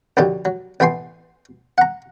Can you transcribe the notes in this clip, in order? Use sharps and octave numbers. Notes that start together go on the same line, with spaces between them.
A#1 F#2 D3 D#4 G4
F#3
A1 B3 G5 G#5 C6
F#5 A#5